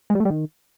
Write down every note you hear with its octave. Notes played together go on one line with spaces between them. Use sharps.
G#3
G3
A3
G3
D#3